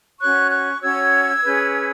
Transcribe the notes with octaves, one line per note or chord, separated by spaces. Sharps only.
C#4 F#4 C#5 C#6 F#6
C#6 F#6
C#4 F#4 C#5 E6 G#6
C#4 G#4 B4